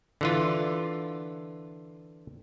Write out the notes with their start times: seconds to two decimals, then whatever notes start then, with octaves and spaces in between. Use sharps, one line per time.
0.21 D3 E3 F4